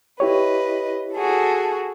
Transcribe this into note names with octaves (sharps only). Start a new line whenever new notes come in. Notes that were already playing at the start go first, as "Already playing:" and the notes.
E4 G4 B4 C#5 D#5
F#4 G#4 A4